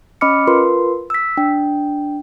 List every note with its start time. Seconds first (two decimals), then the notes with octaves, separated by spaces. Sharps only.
0.21 C#4 D#5 B5 D6 F6 C#7
0.47 F4 A#4 B4 C6
1.10 E6 B6
1.37 D4 G5